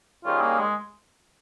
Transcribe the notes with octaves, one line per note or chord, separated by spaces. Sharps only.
D#3 G3 C#4 F4 G#4
A#3
G#3